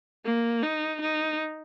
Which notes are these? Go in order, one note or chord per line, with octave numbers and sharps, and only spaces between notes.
A#3
D#4
D#4